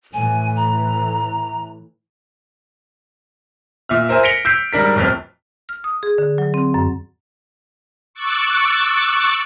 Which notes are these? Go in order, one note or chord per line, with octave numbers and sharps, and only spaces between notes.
A2 E3 G#5
A#5
A#2 E5 F6
A#4 C5 E5 G#5
A#6 B6 C#7 D7 F7 G7
E6 G6 B6 C7 D7
G#2 G3 D4 A#4 B6
D1 G1 F2 F6
F6
D#6
G#4
D3
F#3
C4
F#2
C#6 D6 E6 F#6 A6